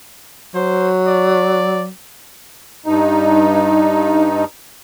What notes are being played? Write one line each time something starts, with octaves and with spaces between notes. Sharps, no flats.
F#3 C5
D5
G2 D#4